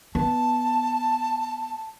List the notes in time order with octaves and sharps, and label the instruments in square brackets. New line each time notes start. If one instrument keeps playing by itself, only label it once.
[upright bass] B3 [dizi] A5